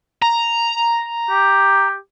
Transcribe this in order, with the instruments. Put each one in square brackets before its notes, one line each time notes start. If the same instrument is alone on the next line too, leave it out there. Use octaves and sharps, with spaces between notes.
[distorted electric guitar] A#5
[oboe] G4